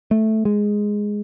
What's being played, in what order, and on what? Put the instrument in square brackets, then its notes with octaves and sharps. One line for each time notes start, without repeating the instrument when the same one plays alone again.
[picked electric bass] A3
G#3